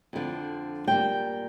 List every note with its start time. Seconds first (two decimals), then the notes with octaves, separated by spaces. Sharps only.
0.13 F2 D3 F3
0.88 A#2 G3 A#3 G5